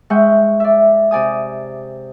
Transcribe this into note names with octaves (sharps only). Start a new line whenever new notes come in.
G#3 E5 F#5 G5 C#6 G6
D5 E5
C3 D5 G#5 D#6